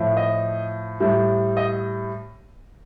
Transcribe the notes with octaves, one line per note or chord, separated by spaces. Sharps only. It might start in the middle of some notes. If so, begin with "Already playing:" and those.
Already playing: A2 F3
D#5
A2 G3
D#5